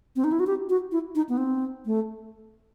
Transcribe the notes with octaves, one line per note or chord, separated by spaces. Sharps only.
C4
D#4
E4
F#4
G4
F#4
E4
D#4
B3
C4
A3